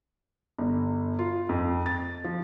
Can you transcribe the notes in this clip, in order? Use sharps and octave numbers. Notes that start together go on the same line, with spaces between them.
G1
F4
F2
A6
F3